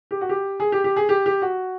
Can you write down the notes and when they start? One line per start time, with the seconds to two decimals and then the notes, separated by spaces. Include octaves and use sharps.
0.11 G4
0.21 F#4
0.29 G4
0.60 G#4
0.72 G4
0.84 G4
0.96 G#4
1.09 G4
1.26 G4
1.42 F#4